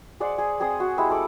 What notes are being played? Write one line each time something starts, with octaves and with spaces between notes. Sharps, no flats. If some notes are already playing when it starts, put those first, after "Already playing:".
G#4 C5 D5 F#5
G#4
C4 G#4 C5 D#6
F#4
G#3 E4 G4 E6
A4 F#5 D6